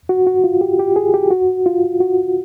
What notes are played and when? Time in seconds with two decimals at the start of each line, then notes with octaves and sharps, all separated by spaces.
0.09 F#4
0.27 F#4
0.44 F4
0.61 G4
0.79 G4
0.96 G#4
1.14 G4
1.30 F#4
1.66 F4
2.00 F#4